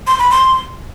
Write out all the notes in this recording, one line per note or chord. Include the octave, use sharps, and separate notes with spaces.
C6
B5
C6